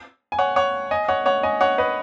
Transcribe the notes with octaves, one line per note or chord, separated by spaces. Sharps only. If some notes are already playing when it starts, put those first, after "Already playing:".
G#5
C#5 F#5
C#5 F#5
D#5 G#5
C#5 F#5
C#5 F#5
D#5 G#5
C#5 F#5
B4 D#5